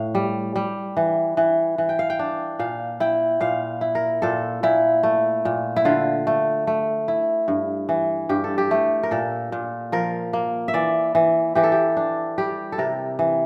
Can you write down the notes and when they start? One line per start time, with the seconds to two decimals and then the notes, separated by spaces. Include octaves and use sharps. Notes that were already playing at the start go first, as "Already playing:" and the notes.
Already playing: A2 F5
0.15 G3
0.56 G3
0.97 E3
1.37 E3
1.78 E3
1.89 G5
1.99 F5
2.10 G5
2.19 D4
2.59 A#2 F5
3.00 E4 G5
3.41 A#2 F5
3.81 E4
3.95 A#4
4.22 A#2 A4
4.63 A#2 E4
5.03 A3
5.45 A#2
5.76 E4
5.85 D3 F4
6.27 A3
6.67 A3
7.08 E4
7.48 G2
7.89 E3
8.29 G2 G4
8.44 A4
8.58 G4
8.71 A3
9.03 A#4
9.11 A#2 A4
9.52 A#2
9.92 F3 A#4
10.33 A#3
10.68 E5
10.74 E3 D5
11.15 E3
11.55 E3 G4
11.63 A4
11.72 G4
11.97 D4
12.38 G3 G4
12.72 A4
12.78 C3 A#4
13.19 E3